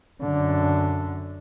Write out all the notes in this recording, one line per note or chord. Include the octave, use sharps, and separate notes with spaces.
F#2 D3